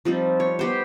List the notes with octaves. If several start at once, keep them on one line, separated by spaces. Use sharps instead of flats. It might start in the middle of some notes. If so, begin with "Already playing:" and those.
F3 G3 C4 D#4
C#5
B3 G4 C5